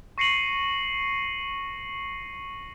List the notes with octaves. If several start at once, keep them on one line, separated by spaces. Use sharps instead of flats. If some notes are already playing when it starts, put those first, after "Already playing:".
C#6 A#6 C7 C#7 D#7 F#7